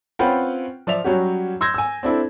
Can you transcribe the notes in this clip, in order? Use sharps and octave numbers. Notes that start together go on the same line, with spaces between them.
C4 C#4 F4 B4 F#5 G5
F3 D5 E5 F7
F#3 G3 C#4 F#4 G4
C6 E6 G6 G#6 A#6
G#5 E6
C4 D4 E4 A4